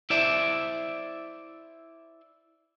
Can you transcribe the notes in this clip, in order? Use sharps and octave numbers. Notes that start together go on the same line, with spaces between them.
E4 C5 D5 E5